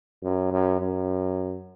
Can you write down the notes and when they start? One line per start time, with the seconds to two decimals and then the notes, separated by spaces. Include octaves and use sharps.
0.23 F#2
0.52 F#2
0.80 F#2